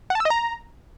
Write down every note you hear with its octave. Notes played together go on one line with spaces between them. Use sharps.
F#5
A5
E6
D#5
A#5